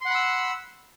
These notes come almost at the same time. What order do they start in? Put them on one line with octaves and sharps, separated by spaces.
C6 F#5 B5 E6